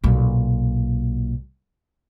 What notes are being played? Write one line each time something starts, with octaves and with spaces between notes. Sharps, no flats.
B1 A#2